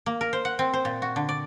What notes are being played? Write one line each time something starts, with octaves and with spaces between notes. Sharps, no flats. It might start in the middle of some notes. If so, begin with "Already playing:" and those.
A#3
A#4
C5
F#5
C4
C5
A#2
F#4
D3
D5